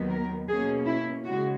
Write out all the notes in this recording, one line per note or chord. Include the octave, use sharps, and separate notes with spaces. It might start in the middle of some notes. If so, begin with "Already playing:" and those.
Already playing: D#2 D#3 F#3 B3
A#4
B2 A#3 C#4 G#4
E4
C#3 G#3 F#4